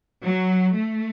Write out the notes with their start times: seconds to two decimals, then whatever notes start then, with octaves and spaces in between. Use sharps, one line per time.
0.24 F#3
0.78 A3